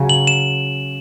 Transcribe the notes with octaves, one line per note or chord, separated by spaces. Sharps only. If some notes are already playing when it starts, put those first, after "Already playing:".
Already playing: C#3 F#3 C#4
F#7
E7